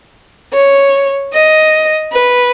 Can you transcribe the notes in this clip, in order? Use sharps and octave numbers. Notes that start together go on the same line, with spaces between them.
C#5
D#5
B4